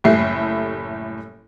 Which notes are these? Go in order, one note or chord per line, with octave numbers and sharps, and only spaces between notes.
F#1 A2 G3 A3 E4 C7